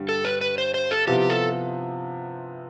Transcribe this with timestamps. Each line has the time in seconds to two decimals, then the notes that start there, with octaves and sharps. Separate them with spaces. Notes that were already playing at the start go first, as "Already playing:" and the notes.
Already playing: G2 D3 G3 D4
0.09 A4
0.25 B4
0.41 B4
0.58 C5
0.74 C5
0.91 A4
1.07 C3 F3 B3 E4 G4
1.30 A4